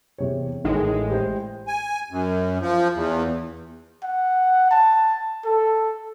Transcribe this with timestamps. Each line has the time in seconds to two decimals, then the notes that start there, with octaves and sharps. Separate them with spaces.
0.18 E2 C3 C#5
0.64 A1 A2 D#3 G#3
1.10 G4 C5
1.67 G#5
2.11 F#2
2.61 F3
2.95 E2
4.04 F#5
4.71 A5
5.45 A4